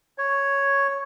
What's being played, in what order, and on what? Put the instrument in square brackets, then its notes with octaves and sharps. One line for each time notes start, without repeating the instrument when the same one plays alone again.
[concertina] C#5